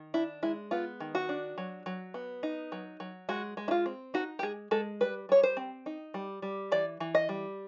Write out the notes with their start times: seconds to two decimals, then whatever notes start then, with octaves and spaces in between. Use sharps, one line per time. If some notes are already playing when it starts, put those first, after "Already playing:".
Already playing: D#3
0.14 D4 E4
0.43 G#3 E4
0.71 B3 F4
1.00 D#3
1.15 F#4
1.29 D4
1.58 F#3
1.86 F#3
2.14 B3
2.43 D#4
2.72 F#3
3.00 F#3
3.29 G#3 F#4
3.57 G#3
3.68 E4
3.71 F4
3.86 C4
4.14 D#4 F#4
4.39 G4
4.43 G#3 G#4
4.71 G#3 A4
5.01 G3 B4
5.29 G3 C#5
5.43 C5
5.57 C4
5.86 D#4
6.14 G3
6.42 G3
6.72 E3 D5
7.00 E3
7.15 D#5
7.29 G3